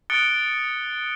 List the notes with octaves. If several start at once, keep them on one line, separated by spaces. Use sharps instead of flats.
D#6 F#6 A6 C#7 D7 G7